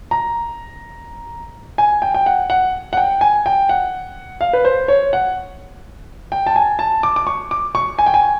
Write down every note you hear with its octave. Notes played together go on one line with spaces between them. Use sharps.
A#5
G#5
G5
G5
F#5
F#5
F#5
G5
G#5
G5
F#5
F5
B4
C5
C#5
F#5
G5
A5
G#5
A5
D6
D6
C#6
D6
C#6
G#5
G5
G#5